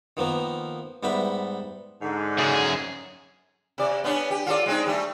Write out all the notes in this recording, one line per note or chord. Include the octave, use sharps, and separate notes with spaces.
D#3 F3 A#3 B3
G#2 G3 B3 E5 B5
G#2 D3
F#2 G#4
C3 D5
B3 C#4 D4
G4
F4 A4 D5
G#3 C4 D#4
G3 A3